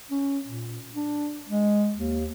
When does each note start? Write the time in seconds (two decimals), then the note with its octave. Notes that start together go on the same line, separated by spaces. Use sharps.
0.11 C#4
0.46 A#2
0.95 D4
1.49 G#3
1.96 D#2